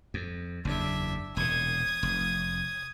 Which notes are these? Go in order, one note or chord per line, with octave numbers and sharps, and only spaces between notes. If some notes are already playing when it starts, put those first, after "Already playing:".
F2
F#1 E2 D4 E5
E1 A#2 D#6 G#6
F1